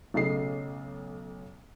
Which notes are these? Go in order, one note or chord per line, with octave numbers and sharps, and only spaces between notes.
B1 C#3 A3 D#5 C7